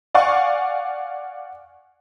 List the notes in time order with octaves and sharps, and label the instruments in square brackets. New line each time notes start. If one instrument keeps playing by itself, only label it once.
[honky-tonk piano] D5 F5 F#5 G#5 C#6